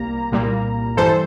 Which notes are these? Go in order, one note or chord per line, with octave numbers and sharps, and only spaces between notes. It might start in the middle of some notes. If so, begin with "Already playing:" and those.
Already playing: C2 G3 A#3 A#5
C2 A#2 G3 A#3
G2 E3 G3 A4 C5